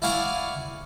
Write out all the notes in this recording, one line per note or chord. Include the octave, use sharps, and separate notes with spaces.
E4 D5 F5 F#5 G#5 C#6